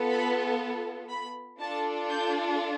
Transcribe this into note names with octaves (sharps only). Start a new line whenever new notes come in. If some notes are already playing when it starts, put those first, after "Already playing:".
Already playing: B3 F4 A4
B5
B5
D4 F4 A4 A5
G6